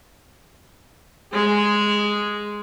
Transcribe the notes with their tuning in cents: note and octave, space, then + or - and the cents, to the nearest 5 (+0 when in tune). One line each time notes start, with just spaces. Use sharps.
G#3 +0 G#4 +0